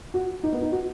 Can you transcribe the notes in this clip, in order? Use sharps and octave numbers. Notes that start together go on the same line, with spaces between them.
F#4
D#4
B3
D#4
F#4